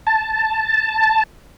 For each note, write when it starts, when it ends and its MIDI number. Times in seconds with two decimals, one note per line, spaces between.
0.07 1.23 81